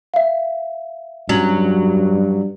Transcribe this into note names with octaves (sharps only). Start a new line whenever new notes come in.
E5 F5
G2 F#3 C#4